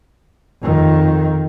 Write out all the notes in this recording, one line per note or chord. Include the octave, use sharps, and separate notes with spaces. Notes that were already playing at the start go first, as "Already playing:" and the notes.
F2 D#3